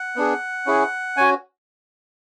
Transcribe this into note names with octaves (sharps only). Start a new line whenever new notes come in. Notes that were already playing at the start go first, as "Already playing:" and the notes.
Already playing: F#5
B3 D4 G#4
C#4 E4 G#4
C#4 F#4 G#5